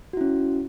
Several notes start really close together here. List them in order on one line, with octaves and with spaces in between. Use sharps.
F#4 E4 C#4